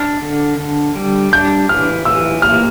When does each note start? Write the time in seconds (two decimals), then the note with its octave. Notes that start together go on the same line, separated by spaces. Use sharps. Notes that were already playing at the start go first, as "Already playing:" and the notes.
Already playing: D4 F6
0.22 D3
0.58 D3
0.95 G3
1.32 D4 G6
1.69 E3 F6
2.05 E3 E6
2.42 A#3 F6